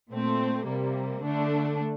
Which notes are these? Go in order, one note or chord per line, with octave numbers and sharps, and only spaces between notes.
A#2 A3 C4
C3 G3 A#3
D3 A3 D4